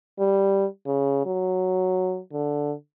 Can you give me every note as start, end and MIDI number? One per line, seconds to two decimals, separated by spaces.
0.19 0.66 55
0.86 1.23 49
1.26 2.19 54
2.33 2.73 50